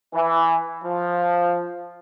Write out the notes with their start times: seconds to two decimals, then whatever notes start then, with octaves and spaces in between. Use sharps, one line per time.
0.13 E3
0.83 F3